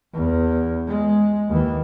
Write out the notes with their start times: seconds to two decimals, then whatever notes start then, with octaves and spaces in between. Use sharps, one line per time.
0.13 E2
0.87 G#3
1.49 D#2 E3